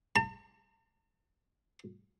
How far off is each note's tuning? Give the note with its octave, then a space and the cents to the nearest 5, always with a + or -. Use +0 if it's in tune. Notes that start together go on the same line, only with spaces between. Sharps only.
A5 +45